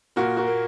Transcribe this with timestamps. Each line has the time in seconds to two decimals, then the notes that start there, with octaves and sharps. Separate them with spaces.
0.16 A#2 F#4 A#4
0.37 F#4 A#4
0.47 A#3